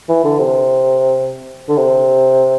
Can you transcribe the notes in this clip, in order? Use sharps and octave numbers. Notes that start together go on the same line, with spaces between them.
E3
D3
C3
D3
C3